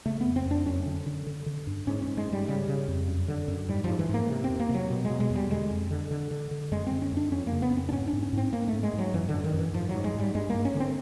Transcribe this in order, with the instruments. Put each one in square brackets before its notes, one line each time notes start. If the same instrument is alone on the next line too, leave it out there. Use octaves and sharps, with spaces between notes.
[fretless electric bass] C#3 A3
F2 B3
C4
F2 D4
F#2 C#4
D3
D3
D3
D3
G2
G#2 C#4
C#4
G#2
G#3
G#2
G3
C#3 G3
C#3
F2
F#2
D3
F#2
G#2 G3
G#2 F3
E3
G#2 A#3
C3
C4
E2
A#3
C3
F#3
B2
G#3
B2
G#3
E2
G3
D3 G#3
F2
D3
D3
D3
D3
F#2 G#3
D3 C4
C#4
F#2 D4
F2 C#4
A#3
C#3
B3
F2 C4
D4
G#2 C#4
D4
G#2
C#4
G#2 C4
G#2 A#3
A3
G#2
G#3
G#2
F#3
F#2 E3
D3
F#2
D#3
F#2 E3
G#2 F3
G#2 F#3
G#3
G#2
G3
G2 G#3
G2 A#3
C#4
D3
C4